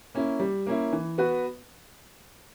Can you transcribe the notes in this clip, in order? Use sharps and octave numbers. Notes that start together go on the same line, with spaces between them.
A#3 C#4 E4
G3
A#3 C#4 E4
E3
B3 F#4 B4